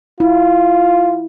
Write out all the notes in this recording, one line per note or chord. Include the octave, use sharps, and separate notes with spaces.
E4 F4